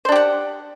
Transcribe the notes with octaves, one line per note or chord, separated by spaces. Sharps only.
D4 G4 C5 F#5